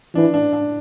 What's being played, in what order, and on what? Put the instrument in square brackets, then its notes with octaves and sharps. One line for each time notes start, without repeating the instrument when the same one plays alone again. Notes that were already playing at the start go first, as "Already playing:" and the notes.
[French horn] E3 [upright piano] D4
[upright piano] D4
D4